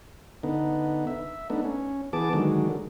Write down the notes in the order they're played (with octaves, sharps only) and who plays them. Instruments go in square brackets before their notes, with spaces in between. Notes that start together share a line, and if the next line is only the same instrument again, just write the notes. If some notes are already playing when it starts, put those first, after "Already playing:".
[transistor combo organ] D3 B3 D#4
E5
A3 B3 D4 D#4
C#4
E3 B3 G#4 A5 D6
D3 D#3 F#3 G#3